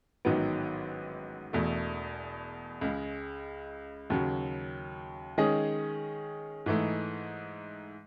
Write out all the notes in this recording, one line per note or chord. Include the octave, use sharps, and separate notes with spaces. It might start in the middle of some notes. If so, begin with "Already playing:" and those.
A1 G#2 D#3 F#3 B3
E1 E2 B2 A3
C#2 C#3 G#3
D#2 C#3 F#3
D#3 G#3 C#4 G#4 D#5
G#2 E3 A3 D#4